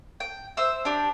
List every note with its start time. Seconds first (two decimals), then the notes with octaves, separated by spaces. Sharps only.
0.20 G5
0.57 C5 E5 E6
0.85 D4 G4